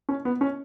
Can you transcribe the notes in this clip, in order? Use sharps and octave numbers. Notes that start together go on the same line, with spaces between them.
C#4
B3
C#4